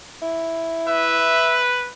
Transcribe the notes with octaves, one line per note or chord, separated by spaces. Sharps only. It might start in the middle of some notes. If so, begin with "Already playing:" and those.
E4
B4 E5